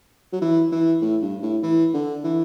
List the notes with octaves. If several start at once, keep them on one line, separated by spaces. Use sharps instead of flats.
F#3
E3
E3
A2
G2
A2
E3
D3
E3